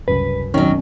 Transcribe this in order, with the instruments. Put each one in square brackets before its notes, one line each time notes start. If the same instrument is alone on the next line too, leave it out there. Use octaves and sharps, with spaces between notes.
[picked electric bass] F#1 C2 [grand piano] F#2 [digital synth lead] B4
[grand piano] G#1 F#2 B2 [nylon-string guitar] D#3 F#3 [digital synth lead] C#4